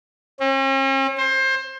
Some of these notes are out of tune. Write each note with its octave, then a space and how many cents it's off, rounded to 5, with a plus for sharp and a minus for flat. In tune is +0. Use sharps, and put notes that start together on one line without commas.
C#4 -45
C5 +25